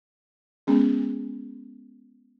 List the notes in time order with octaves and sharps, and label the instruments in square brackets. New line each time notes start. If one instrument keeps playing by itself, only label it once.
[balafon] G#3 B3 C#4 G#4